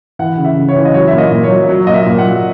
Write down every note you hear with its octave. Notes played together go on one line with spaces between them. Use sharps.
E3 F#5
C#3
E5
C#3
C#5
E3
D#5
F#3 C#5
E5
A#2
D#5
A#2
C#5
F#3
F#3
A#2 D#5
E5
A#2
F#5
F#3